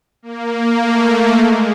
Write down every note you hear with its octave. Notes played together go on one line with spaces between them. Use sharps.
A#3
A3
G#3